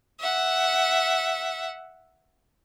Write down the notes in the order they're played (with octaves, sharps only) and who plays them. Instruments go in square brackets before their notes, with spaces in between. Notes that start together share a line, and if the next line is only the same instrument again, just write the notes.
[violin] E5 F#5